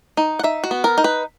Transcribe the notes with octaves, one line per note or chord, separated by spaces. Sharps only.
D#4
F#5
D#4 E5
F#4
B3
A#4
D#4
B4